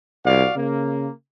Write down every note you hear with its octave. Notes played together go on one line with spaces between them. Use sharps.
C2 F#4 D5 F5
C#3 A#3